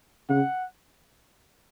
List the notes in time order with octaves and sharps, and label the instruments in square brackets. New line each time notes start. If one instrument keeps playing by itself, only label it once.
[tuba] C#3 [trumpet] F#5